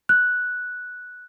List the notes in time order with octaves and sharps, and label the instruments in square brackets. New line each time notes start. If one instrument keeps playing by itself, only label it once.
[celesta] F#6